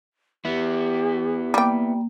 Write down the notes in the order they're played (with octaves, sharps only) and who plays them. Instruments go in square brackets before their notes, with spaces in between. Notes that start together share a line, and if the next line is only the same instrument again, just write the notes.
[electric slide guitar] B3 E4 [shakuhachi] G4
[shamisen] G3 G5 [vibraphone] A#3